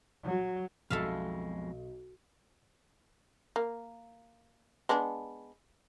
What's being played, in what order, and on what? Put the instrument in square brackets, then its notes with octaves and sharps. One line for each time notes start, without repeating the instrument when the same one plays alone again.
[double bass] F#3
[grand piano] B1 [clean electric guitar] F2 B2 G#3 [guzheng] A4 E5 F5
[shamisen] A#3
G#3 B3 D4